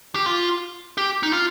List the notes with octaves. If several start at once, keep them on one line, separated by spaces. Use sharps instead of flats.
G4
F4
G4
D#4
F4